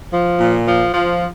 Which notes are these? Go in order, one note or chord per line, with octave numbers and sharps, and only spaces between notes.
F3
A#2
F3
F3